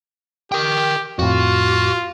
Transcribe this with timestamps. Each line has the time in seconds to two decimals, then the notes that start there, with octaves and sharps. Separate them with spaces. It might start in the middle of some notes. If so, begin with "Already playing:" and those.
0.52 G4 A#4 G5
1.19 F2 A2 F4 F#4